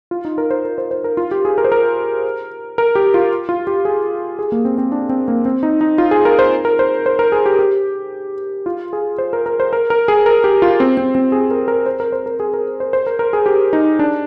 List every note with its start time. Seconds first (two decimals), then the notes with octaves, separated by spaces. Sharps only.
0.11 F4
0.25 D#4
0.38 A#4
0.50 C5
0.65 A#4
0.78 C5
0.91 C5
1.04 A#4
1.17 F4
1.31 G4
1.45 G#4
1.58 A#4
1.64 C5
1.72 A#4
2.78 A#4
2.95 G4
3.14 F4
3.49 F4
3.67 G4
3.85 G#4
4.39 G#4
4.52 A#3
4.65 C4
4.78 C4
4.92 D4
5.09 C4
5.28 A#3
5.45 C4
5.63 D#4
5.81 D#4
5.98 F4
6.11 G#4
6.25 A#4
6.39 C5
6.65 A#4
6.79 C5
7.06 C5
7.19 A#4
7.32 G#4
7.46 G4
7.59 G4
8.66 F4
8.93 G#4
9.18 C5
9.33 A#4
9.46 A#4
9.60 C5
9.73 A#4
9.90 A#4
10.08 G#4
10.26 A#4
10.44 G4
10.62 F4
10.80 C4
10.97 C4
11.15 C4
11.32 G#4
11.51 A#4
11.68 A#4
11.86 C5
12.00 A#4
12.12 C5
12.26 A#4
12.40 G#4
12.54 A#4
12.80 C5
12.93 C5
13.06 A#4
13.19 A#4
13.33 G#4
13.46 G4
13.73 D#4
13.99 D4